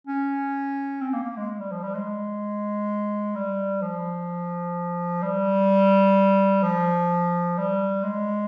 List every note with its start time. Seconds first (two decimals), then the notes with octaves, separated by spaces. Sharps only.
0.07 C#4
1.01 C4
1.13 A#3
1.24 A#3
1.37 G#3
1.59 G3
1.72 F3
1.83 G3
1.95 G#3
3.36 G3
3.82 F3
5.23 G3
6.63 F3
7.58 G3
8.04 G#3